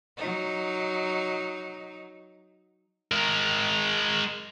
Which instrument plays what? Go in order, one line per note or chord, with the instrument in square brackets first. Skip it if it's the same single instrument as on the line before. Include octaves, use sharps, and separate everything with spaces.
[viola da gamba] F#3 D#4
[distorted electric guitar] G#3 A#4